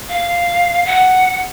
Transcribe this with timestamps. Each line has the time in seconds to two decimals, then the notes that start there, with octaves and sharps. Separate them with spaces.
0.09 F5
0.86 F#5